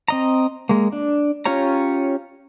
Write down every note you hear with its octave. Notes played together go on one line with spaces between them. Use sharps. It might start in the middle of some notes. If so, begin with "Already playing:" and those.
C4 D#5 A#5
G#3 A#3
D4
C#4 F4 G4 C#5 A#5